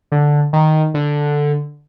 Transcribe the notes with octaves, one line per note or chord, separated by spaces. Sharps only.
D3
D#3
D3